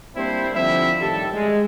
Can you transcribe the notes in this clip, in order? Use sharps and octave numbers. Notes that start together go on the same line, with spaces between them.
G3 A#3 C4 D4 E4 C5
D3 F3 G3 C4 E4 E5
A2 D#3 G3 G4 A4
G#3